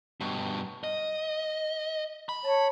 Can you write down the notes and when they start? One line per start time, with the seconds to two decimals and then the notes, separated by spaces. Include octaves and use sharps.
0.21 G2 B2 C#5 F#5 C#6
0.84 D#5 F5
2.29 B5
2.44 C#5 A5